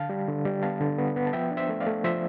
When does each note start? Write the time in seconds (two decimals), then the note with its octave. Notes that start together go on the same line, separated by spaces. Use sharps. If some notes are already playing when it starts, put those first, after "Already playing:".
Already playing: D3 F5 A5
0.10 G3
0.28 D3
0.46 G3
0.63 B3 F5 A5
0.81 D3
0.98 B3
1.16 B3
1.27 A5
1.33 F3 E5 G5
1.51 D4
1.57 C5 E5
1.69 A3
1.80 D5 F5
1.86 A3
2.04 F3 C5 E5